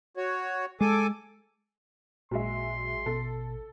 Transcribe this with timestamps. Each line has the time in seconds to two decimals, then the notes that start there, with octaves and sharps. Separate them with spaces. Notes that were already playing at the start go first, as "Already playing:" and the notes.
0.17 F#4 C#5
0.81 G#3 A4 G#5 D6
2.31 A1 A#2 F#3 G#3 E5 C6
3.06 B2 A4